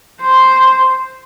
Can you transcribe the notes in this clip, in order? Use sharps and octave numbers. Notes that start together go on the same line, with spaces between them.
C5